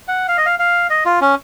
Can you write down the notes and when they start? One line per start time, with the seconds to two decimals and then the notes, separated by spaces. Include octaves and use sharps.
0.08 F#5
0.28 F5
0.37 D#5
0.46 F5
0.59 F5
0.90 D#5
1.05 F4
1.21 C#4